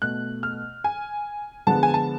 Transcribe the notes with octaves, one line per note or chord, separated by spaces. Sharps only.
B2 A3 F#6
F6
G#5
D3 F3 G#3 B3 A5
G#5
A5